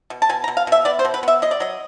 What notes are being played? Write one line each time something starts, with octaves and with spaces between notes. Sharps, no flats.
B2
A5
B2 G#5
A#5
B2
F5
B2 E5
B3 D5
C5
B2
B4
B3 E5
F#3 D#5
D5
F#3 D#5